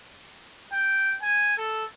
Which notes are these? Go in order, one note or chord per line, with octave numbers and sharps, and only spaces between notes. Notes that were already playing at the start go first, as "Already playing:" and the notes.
G5
G#5
A4